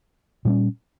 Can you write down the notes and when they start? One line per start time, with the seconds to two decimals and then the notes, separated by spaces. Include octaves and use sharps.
0.45 A#2 G3 C#4